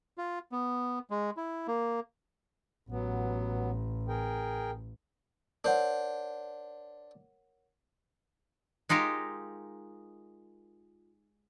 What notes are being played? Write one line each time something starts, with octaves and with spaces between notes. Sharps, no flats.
F4
B3
G#3
E4
A#3
A1 F#3 B3
G#4 A#4 G5
D4 A#4 C5 C#5 F#5
G#3 D#4 F4 G4 A#4